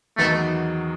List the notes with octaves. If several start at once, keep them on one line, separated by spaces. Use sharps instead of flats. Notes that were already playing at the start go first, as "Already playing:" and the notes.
E2 D#3 F#3 A3 B3 D#4